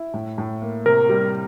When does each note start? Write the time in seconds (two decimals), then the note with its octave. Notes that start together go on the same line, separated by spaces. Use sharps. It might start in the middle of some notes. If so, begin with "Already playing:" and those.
Already playing: E4
0.14 A2
0.38 A2
0.62 A#3
0.86 C3 A#4
1.09 G3